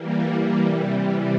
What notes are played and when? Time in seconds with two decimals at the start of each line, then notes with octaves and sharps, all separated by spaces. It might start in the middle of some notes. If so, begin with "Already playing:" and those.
Already playing: E3 G3 A#3
0.58 C3 E3 G3